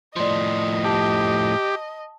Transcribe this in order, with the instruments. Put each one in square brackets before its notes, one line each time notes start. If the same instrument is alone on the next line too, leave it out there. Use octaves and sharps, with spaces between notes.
[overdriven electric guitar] A2 F3 [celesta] D5 C6 [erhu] D#5
[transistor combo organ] G4 [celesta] A5